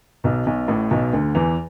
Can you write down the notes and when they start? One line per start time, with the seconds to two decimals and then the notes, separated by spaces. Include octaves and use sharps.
0.24 B1 B2
0.46 B1 B2
0.68 A1 A2
0.91 B1 B2
1.13 D2 D3
1.35 E2 E3